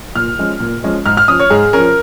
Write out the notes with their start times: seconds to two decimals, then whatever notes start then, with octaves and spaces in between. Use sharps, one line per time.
0.15 A#2 F6
0.38 F3 G#3 C#4
0.60 A#2
0.83 F3 G#3 C#4
1.06 G#2 F6
1.17 F6
1.28 F3 C#4 D#6
1.40 C#5
1.50 G#2 G#4
1.73 F3 C#4 A#4